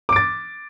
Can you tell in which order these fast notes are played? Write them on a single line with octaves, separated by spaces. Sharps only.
D6 D7 A6